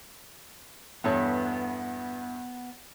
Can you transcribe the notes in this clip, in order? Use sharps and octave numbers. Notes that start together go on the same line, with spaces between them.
E2 G2 B3 A4 B4 C#5